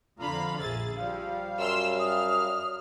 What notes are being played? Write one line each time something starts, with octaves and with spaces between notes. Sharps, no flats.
F2 D3 F4 F5 A#5 B5
A#1 G#4 E5 A6
F3 G3 F5
F#2 C6 E6 F6
D#6 F6